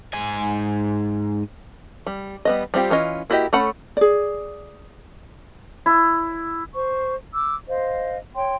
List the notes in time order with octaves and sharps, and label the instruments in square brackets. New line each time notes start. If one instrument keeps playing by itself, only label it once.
[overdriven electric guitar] G#2 G#5
[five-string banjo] G3
G3 B3 D#5
G3 C4 F4 G4
E3 C#4 F4 D#5
A#3 E4 F#4 G4 D#5
A3 C#4 A4 F#5 B5
[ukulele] G#4 D5
[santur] E4
[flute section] C5 C#6
D6 E6
C5 D#5 F5
C#5 G5 C6